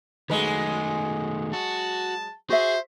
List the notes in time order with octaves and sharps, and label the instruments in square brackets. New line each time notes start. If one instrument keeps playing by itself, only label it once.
[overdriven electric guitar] D#3 A3 [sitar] F#3 G#3 [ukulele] B4
[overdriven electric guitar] F#4 [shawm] A5
[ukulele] F#4 E5 [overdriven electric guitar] G#4 [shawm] C5